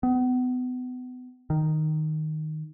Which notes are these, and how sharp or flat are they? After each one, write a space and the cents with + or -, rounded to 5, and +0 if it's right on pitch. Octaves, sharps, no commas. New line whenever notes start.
B3 +30
D#3 -5